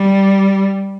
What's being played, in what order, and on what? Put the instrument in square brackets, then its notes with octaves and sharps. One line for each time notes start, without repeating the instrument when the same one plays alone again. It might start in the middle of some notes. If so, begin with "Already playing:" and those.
Already playing: [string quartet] G3